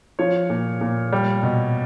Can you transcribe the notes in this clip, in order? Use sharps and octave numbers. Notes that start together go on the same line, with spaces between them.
F3 C#5
A#2
A#2
G3
B2